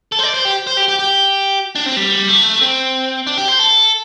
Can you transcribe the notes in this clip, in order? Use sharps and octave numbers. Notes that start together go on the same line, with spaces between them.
A4
C5
D5
C5
G4
C5
G4
G4
G4
D4
C4
G3
A3
C4
D4
G4
C5
A4